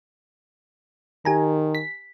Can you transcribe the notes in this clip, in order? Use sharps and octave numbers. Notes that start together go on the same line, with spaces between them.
D#3 G4 G#5 A#5
B6